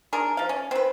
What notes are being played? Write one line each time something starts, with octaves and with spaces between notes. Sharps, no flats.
D4 G#4 A#4
F3 F5
C#4
C4 B4